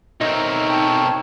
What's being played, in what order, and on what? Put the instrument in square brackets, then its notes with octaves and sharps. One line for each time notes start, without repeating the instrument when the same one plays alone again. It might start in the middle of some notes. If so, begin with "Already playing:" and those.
[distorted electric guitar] B1 C4 [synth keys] D#4 [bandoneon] A#4 C#5 E5
[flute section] G5 A5 C#6